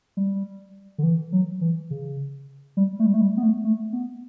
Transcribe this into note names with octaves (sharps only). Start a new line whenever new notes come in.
G3
D3
E3
F#3
E3
C#3
G3
A3
G3
A3
G3
B3
A3
A3
B3